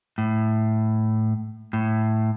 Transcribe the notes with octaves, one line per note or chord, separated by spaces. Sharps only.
A2
A2